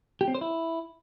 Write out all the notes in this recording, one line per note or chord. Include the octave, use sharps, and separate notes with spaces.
G4
C4
C5
E4